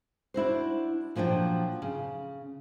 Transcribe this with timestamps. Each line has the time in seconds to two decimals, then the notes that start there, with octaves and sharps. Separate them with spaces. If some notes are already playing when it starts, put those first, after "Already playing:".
0.34 D4 E4 F#4 C5
1.16 A#2 F3 F#3 D4 G5
1.82 C#3